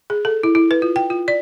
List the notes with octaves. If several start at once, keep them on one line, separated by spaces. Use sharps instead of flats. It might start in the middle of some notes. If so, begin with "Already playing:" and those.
G#4
A4
E4
E4
B4
F4
G5
F4
D5